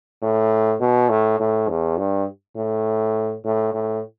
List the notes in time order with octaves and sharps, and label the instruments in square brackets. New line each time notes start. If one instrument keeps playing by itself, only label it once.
[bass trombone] A2
B2
A2
A2
E2
G2
A2
A2
A2